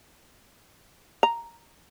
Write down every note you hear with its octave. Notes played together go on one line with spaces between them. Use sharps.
A#5